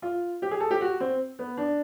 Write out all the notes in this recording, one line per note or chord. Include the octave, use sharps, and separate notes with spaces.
F4
G4
G#4
A4
G4
F#4
C4
B3
D4